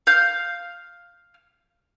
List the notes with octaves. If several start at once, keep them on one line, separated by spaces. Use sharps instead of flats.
F5 G6